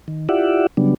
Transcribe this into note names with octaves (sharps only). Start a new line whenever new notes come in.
D#3
E4 F4 G4 D5 E5 F#5
C#3 F#3 G3 B3 D4